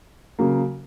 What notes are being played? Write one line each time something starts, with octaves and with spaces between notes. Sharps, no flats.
C#3 F#3 A#3